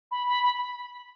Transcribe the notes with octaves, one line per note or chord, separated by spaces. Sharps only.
B5
B5
B5